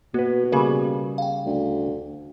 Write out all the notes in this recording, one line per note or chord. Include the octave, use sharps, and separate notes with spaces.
B2 A#3 F#4 B4
C#3 G3 A#3 G#4 A#4
F5 G5
D2